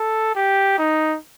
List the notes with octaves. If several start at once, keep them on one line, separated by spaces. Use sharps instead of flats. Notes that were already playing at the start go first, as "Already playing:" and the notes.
Already playing: A4
G4
D#4